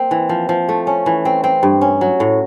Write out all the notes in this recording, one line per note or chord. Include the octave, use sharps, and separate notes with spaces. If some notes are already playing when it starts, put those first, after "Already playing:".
Already playing: A#3 C4
E3
F3
F3
A3
C#4
E3
C4
C4
G2
C#4
F#3
A2